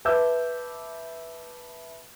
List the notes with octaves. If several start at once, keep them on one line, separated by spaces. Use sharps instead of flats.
B4 E5 A5 D6 E6 G6